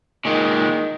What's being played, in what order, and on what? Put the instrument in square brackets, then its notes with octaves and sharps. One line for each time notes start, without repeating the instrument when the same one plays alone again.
[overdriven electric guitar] A#2 G#3 [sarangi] D#3